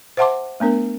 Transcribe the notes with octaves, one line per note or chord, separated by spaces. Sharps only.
C5 E5 F#5 A5 C6 D6
A3 B3 D4 A#4